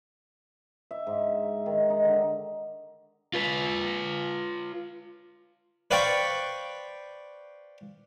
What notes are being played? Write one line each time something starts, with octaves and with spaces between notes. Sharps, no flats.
E5
G#2
D#3
D#4
D3
F4 B4
B4 C5 D5 F5 G5 C#6